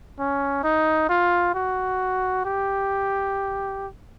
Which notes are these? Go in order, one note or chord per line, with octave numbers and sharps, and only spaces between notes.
C#4
D#4
F4
F#4
G4